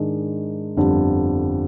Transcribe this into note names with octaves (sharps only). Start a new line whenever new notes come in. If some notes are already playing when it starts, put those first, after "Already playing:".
Already playing: G#2 D#3 G#3 D4
G1 F2 D3 G3